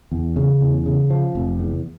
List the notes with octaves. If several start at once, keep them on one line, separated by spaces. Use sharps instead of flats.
E2
C#3
E2
C#3
F3
F1
E2